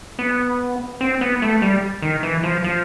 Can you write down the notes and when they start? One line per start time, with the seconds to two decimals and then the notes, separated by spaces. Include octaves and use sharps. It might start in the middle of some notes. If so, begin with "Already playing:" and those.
0.19 B3
1.01 C4
1.21 B3
1.42 A3
1.62 G3
2.02 D#3
2.23 E3
2.43 F3
2.64 F3